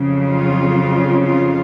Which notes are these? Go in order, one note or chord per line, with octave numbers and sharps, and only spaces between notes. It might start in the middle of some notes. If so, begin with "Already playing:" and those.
Already playing: F2 C#3 F#3
F4
F4